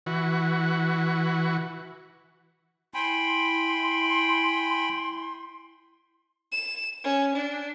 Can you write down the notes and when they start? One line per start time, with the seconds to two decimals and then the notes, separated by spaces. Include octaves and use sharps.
0.06 E3 F#4
2.94 E4 G5 G#5 B5 C6
6.52 E7
7.04 C#4
7.35 D4